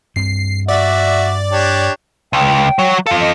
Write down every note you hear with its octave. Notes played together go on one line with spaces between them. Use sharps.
G2 C4 C7
F#4 D5 E5
D4 G4 C#5
C#2 G5
F#3 C#5
F4 A4 F5
D#5